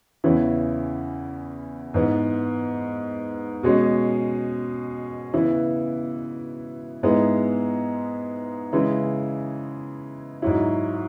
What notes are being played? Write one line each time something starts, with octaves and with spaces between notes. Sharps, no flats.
E2 C#3 E3 C#4 E4
G#2 E3 B3
B2 G#3 C#4
C#3 E3 B3 E4
G#2 G#3 B3 E4
C#3 E3 G#3 E4
G#2 F#3 E4